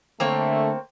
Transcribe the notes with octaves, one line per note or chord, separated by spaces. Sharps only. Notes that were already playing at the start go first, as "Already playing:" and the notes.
D3 A3 A#3 C4 C#5